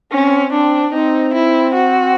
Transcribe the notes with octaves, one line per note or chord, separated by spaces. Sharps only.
C4 C#4
D4
C4 D#4
E4
F#4